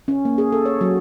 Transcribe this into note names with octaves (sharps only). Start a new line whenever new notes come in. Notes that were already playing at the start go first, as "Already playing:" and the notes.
C#4
A#3
G#4
A4
C#5
F#3